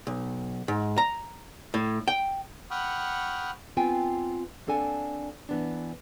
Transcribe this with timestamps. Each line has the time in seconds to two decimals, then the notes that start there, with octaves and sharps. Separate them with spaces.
0.07 B1
0.68 G#2
0.98 A#5
1.74 A2
2.08 G5
2.71 F#5 G5 B5 C#6 D#6 F6
3.77 B3 C4 F4 G5 G#5
4.67 A#3 C4 D4 A4 F#5 G#5
5.49 E3 B3 D4